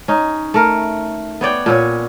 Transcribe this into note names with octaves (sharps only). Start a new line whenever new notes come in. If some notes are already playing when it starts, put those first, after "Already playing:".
C#4 D#4
A3 A#4
B3 C#5 D5 G5
A#2 B3 C#4 C#5